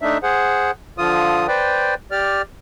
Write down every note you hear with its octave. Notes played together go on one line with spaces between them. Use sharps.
A3 D4 D#4 E5
G#4 C5 F#5
D3 F3 F4 D#6
B4 C5 D5 G5
G4 D5 F6